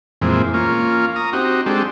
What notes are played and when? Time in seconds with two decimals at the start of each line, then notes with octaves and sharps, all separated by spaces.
0.22 F2 A#2 E3 G#3 C4
0.54 A#3 C#4 F4
1.16 A#5 D#6
1.33 C4 D#4 F#4 G4
1.66 G#3 C4 D4 G4 A4